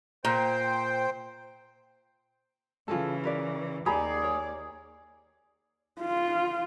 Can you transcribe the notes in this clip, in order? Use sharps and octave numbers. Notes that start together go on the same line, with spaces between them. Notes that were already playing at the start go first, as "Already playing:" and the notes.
A#2 C5 G5
C#3 E3 F4 G#4 A4
A#4 B4 D5
D#2 G4 G#4 D5 A#5 B5
A#4 C#5
F4